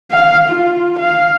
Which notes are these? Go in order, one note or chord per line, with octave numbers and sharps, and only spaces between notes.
F5
F4
F5